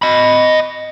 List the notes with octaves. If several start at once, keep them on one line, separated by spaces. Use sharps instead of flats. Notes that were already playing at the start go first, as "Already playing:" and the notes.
D#5 B5